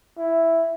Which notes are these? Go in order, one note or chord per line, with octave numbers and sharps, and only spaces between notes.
E4